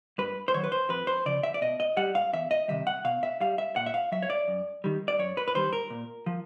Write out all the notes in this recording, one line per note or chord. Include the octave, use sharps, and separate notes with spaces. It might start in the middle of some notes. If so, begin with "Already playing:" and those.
G2 B4
C5
D#3 F#3 C#5
B4
C5
F2 B4
C5
C#3 F3 D5
E5
D5
B2 D#5
D#5
G3 F#5
F5
E2 E5
D#5
C3 D#3 G3 E5
F#5
B2 F5
E5
G3 F5
E5
A#2 F#5
E5
F5
F#3 E5
C#5
D5
F#2
D#3 G3
D5
F#2 C#5
B4
B4
D#3 G3 C5
A#4
A#2
F3